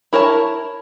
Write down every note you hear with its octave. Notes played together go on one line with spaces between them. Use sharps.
E4 A#4 C#5 A5